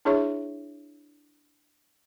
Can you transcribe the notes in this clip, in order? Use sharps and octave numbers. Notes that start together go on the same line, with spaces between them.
D4 E4 G#4 C#5 E5 C#6